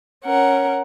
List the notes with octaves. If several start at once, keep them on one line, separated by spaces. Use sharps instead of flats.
C#4 A#4 F#5